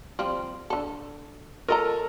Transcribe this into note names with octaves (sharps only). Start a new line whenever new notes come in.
F3 G3 C4
D3 A4
F4 A4 A#4 D#5 A#5